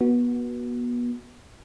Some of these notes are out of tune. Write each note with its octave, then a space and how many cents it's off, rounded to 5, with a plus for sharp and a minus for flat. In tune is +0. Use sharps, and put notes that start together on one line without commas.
B3 -30 F#4 +0